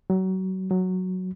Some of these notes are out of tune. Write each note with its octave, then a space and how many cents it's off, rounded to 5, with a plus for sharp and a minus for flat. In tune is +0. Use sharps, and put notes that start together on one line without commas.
F#3 +30
F#3 +0